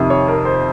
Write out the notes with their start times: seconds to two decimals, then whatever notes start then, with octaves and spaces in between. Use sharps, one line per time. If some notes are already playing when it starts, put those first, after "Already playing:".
Already playing: F2 C3 D#3
0.10 C#5
0.28 A#4
0.45 C5